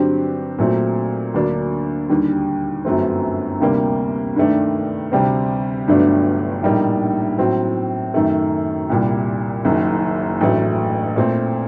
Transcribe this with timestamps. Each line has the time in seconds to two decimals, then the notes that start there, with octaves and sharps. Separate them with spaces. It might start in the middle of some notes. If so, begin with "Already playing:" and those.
Already playing: G2 D3 F#3 C4 G4
0.59 A#2 F#3 A3 C4
1.34 D2 D3 F#3 A#3 D4
2.09 D#2 D3 G3
2.85 G1 F#2 F#3 A3 C4
3.60 D2 C3 G3 A#3
4.36 G2 D#3 A3 D4
5.12 D2 C3 G3 C4
5.87 G1 G2 F#3 A3 D4
6.62 A#1 A2 G3 A#3 D#4
7.39 A2 F#3 C4
8.14 F#2 D#3 A3
8.90 C2 A#2 G3
9.65 F#1 F#2 D#3
10.41 A1 G2 F#3 A3
11.16 A#2 A3 C4